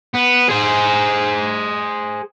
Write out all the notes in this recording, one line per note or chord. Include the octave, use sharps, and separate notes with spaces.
B3
G#4 C5